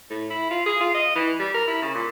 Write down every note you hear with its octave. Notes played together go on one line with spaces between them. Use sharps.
A2
E4
F4
G#4
F4
D#5
E3
G3
A#4
E4
C#3
A#2